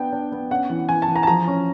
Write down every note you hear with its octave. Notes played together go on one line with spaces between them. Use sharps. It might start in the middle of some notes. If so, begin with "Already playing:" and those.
Already playing: B3 D4 G5
D4
B3
C#4 F#5
E3
E3 G#5
A5
E3
A#5
A5
F3 A#5
C#4